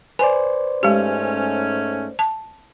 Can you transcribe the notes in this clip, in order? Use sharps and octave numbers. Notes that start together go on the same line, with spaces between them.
B4 C5 D5 G#5
G#2 G#3 A3 C#4 G4
A5